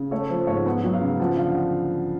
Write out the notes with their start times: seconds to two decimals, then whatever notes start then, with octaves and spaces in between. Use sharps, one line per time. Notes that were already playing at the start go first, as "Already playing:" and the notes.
Already playing: C#3
0.11 A3 C#5
0.29 F3 C5
0.47 G#2 C#5
0.65 B3 F#5
0.84 F#3
0.93 F5
1.01 C#3
1.20 F3 F#5
1.37 D3 F5
1.55 F#5